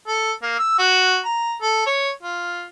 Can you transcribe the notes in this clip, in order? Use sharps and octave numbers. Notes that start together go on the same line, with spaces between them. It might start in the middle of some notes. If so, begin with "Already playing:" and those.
A4
A#3
E6
F#4
A#5
A4
C#5
F4